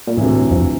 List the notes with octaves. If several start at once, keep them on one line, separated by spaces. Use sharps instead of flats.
A#2
D2 A2 C3 E3
F2